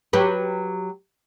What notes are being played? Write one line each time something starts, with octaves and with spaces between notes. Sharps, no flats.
F#3 G4 B4